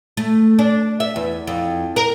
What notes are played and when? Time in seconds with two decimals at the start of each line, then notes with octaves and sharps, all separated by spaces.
0.17 A3
0.59 D4
1.00 E5
1.16 E2
1.47 F2
1.96 A#4